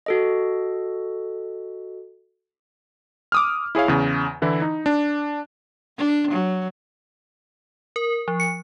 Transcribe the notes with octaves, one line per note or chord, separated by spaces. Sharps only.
F#4 A4 D#5
D6 D#6 F6
E4 G#4 C#5 F5
E2 C#3
D3 E3 E4
D#4
D4
D4
F#3
A#4
F3
C#7